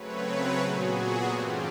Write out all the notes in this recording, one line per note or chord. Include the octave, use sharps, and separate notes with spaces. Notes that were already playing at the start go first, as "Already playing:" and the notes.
Already playing: C#3 F#3 A3 C4 B4 C#5
A#2 F#3 B3 F#4 G#4
G2 E3 A3 C4 F4 G4